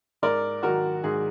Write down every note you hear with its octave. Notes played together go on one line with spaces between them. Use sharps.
G#2 A#4 D5
D#3 F#3 F#4 A#4
G#2 G#4